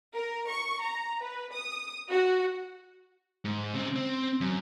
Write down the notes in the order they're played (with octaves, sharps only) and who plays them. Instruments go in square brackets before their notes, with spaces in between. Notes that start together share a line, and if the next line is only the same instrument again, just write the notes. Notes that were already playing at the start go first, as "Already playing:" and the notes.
[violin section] A#4
C#6
A#5
B4
D#6
F#4
[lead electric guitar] G#2
C#3 C4
C4
F#2